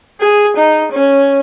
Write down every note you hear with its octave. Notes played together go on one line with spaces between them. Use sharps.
G#4
D#4
C#4